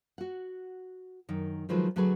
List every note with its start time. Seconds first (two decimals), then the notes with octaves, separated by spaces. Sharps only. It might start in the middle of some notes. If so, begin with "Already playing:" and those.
0.18 F#4 F#5
1.29 F#2 D#3
1.69 D#3 F3 F#3 G#3 B4
1.96 D2 F#3 A3 F#4 G#4 B4